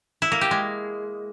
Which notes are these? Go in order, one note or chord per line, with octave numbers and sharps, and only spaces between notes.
E4
A#3
G4
G#3